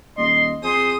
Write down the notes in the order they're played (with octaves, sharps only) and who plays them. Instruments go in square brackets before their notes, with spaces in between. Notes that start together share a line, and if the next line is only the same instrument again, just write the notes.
[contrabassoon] D#1 [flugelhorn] D#5 [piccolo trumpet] C6
[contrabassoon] F2 [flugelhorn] G#4 [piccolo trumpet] C5 [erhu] D#6